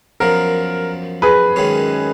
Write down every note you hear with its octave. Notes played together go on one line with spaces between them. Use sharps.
F#2 F3 B3 A#4
G#4 B4
F#2 D#3 G#3 C#4